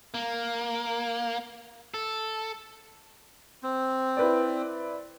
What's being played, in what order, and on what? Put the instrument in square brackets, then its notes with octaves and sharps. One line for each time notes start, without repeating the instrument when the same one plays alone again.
[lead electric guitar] A#3
A4
[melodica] C4
[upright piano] E4 B4 D5